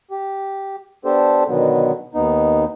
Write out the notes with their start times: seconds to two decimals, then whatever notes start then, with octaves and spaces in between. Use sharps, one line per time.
0.11 G4
1.05 B3 D4 G4 A4 C5
1.48 B2 D3 D#3 F#3 B3
2.14 D#2 B3 D#4